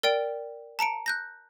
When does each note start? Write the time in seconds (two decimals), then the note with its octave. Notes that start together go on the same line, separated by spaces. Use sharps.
0.03 A#4 D5 G5 D7
0.79 A5 A#5 C#7 D7
1.06 F#6 G6 A#6